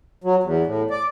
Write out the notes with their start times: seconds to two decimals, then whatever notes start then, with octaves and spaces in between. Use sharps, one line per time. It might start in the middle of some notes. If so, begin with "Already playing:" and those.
0.24 F#3
0.43 E2
0.67 A2
0.90 D5